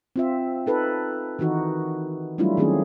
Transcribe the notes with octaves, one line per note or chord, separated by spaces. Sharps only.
C4 F4 E5
D#4 A4 B4
D#3 E3 D#4 F#4
F#3 G3 A3 D4 E4 F4
D#3 F#3 A3 C4 C#4 G#4